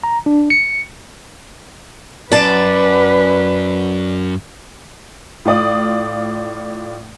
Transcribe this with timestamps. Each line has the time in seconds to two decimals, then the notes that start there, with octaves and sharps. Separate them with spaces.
0.04 A#5
0.26 D4
0.50 C#7
2.32 F#2 B4 D5 A5
5.45 A2 F4 D5 D#6